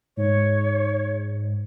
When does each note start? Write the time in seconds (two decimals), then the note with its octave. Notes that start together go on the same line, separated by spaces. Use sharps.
0.17 G#2 C#5